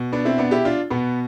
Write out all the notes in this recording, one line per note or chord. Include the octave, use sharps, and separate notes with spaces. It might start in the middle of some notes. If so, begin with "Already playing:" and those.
Already playing: B2
B3 D4
C4 E4
B3 D4
E4 G4
D4 F4
B2 B3